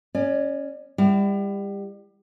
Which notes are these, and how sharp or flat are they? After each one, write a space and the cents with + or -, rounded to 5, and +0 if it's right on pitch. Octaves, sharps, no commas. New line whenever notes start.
C#4 +0 D5 +35
G3 +30 E4 +25 G5 -35